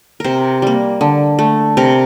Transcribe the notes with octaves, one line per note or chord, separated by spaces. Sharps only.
C3 A#4 C5
G3 A#3
D3
A3
C3 A#4